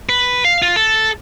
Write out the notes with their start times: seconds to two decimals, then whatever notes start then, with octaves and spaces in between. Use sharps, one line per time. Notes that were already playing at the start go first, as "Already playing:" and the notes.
0.09 B4
0.45 F5
0.62 F4
0.76 A4